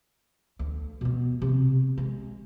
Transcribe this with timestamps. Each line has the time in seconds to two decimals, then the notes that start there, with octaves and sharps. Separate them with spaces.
0.59 D2
1.01 B2 B3
1.42 C3
1.98 G#3